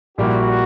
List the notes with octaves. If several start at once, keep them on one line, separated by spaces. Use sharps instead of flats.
A#1 A#2 G3 A#3 E4 F#4